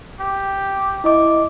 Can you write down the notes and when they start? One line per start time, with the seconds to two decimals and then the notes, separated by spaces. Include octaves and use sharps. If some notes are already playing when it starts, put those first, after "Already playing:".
0.20 G4
1.04 E4 D#5 D6